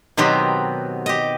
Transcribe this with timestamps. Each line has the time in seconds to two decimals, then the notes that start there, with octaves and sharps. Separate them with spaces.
0.17 B2 D#3 F#3 B3 C4 G4
1.06 G4 D#5